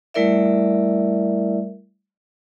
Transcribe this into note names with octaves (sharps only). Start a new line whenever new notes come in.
G3 A3 E4 A#4 D5 E5